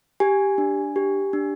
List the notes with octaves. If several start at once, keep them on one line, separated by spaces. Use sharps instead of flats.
G4 G#5
D4
G4
D4